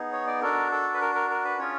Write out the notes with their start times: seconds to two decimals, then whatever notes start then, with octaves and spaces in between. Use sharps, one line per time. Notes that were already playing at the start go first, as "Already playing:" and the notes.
Already playing: B3 D#4 G#4
0.12 C#5
0.27 D5
0.42 D4 F#4 A4 A#4
0.72 A4
0.94 B4
1.01 A#4
1.15 A#4
1.30 A#4
1.45 B4
1.59 C#4 F4 G#4 C#5